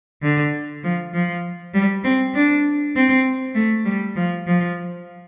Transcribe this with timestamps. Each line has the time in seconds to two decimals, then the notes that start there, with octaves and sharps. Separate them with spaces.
0.23 D3
0.84 F3
1.14 F3
1.74 G3
2.04 C4
2.35 D4
2.96 C4
3.55 A3
3.85 G3
4.16 F3
4.46 F3